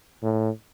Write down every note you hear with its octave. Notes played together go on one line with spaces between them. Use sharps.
A2